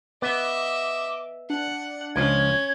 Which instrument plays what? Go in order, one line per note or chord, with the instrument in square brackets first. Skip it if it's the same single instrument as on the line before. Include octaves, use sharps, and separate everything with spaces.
[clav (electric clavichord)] B3 [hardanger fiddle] D#5 E5 [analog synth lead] D6
[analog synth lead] D4 [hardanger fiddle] F#5
[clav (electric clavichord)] C#2 F3 [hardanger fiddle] C#4 [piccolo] G#6